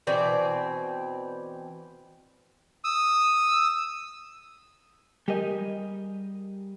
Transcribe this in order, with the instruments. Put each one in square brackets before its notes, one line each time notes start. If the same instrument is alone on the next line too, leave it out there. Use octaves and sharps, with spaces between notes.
[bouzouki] B2 E3 C4 D5
[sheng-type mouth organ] D#6 E6
[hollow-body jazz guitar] G3 G4 G#4 A#4 D#5